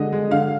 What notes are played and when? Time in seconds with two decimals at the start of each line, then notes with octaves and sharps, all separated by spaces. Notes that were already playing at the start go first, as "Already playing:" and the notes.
Already playing: D3 G#3 D#5
0.13 G#3
0.31 D3 F5